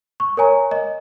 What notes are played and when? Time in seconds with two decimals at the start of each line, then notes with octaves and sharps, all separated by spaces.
0.20 C#6
0.37 A#4 C#5 G#5 A#5
0.71 D#5